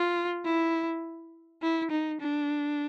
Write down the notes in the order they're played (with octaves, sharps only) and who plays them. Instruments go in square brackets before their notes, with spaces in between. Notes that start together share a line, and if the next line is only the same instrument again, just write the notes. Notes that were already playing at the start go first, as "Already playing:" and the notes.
Already playing: [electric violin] F4
E4
E4
D#4
D4